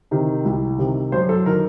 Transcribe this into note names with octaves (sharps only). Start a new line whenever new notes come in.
C3 D#3
C2
C3 D#3
F#2 C5
A4
D#3 A#4